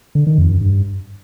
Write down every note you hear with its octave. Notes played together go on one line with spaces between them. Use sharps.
D3
D#3
F2
F#2
G2